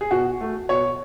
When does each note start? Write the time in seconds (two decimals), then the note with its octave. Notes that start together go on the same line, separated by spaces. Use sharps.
0.01 G#4
0.11 B2 F#4
0.41 A3
0.69 B2 C#5